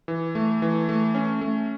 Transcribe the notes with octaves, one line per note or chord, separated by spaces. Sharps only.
E3
A3
E3
A3
C#4
A3